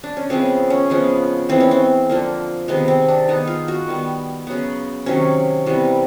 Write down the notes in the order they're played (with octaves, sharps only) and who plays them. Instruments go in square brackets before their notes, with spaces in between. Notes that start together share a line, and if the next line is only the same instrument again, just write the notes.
[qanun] D4
C#4
C#3 F3 G#3 B3 C4
C#4
C#3 F3 G#3 B3
E3 G#3 B3 C4
C#4
C4
D3 F3 A#3
C3 D#3 G#3 B3
C4
D4
D#3 G#3 B3 D#4
F4
F#4
D#3 G3 B3
C#3 F#3 B3
C3 D#3 F#3 C#4
C3 E3 G3 B3